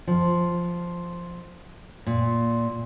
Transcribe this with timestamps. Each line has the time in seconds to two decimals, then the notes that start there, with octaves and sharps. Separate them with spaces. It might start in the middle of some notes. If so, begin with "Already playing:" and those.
0.07 F3
2.06 A#2